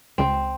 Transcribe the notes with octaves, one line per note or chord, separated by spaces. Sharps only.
C#2 C4